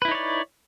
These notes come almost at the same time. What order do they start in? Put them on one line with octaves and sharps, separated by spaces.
B4 E4 D#4 C#5 D5